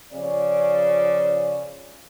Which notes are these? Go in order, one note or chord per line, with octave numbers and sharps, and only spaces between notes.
C#3 F3 D5